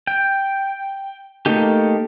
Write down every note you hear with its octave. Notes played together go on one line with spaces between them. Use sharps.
G5
A3 A#3 D#4 G4